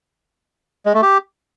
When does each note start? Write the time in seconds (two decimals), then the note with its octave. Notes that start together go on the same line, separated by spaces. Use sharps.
0.86 G#3
0.94 A3
1.03 G4